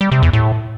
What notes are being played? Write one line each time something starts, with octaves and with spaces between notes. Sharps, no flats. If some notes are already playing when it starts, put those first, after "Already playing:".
G3
C3
E2
A2